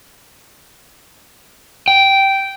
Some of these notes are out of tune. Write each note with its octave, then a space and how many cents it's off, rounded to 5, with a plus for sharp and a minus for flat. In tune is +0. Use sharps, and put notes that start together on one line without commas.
G5 -10